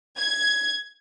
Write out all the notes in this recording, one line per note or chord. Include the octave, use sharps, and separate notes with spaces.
G#6